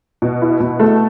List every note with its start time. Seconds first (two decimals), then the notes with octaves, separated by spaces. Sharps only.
0.22 B2
0.42 E4
0.60 B2
0.80 A3